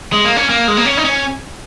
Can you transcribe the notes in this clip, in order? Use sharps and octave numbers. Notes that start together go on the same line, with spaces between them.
G#3
A#3
C#4
A#3
G#3
A#3
C#4
D#4
C#4